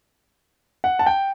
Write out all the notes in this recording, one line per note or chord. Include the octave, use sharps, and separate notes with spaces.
F#5
A5
G5